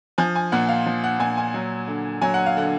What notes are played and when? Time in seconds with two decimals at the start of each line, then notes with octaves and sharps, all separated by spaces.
0.18 F3 G#5
0.35 G#5
0.52 A#2 F#5
0.68 F5
0.86 F3
1.04 F#5
1.19 A#2 G#5
1.37 G#5
1.54 F#3
1.87 D3
2.21 F#3 G#5
2.34 F#5
2.46 F5
2.57 D3 F#5